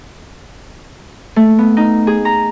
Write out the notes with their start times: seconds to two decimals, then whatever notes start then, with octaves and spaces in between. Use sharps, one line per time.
1.36 A3
1.59 B3
1.77 D#4
2.07 G#4
2.25 A#5